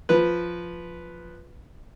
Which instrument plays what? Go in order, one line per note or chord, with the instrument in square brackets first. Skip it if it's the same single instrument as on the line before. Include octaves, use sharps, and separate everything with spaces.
[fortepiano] F3 B4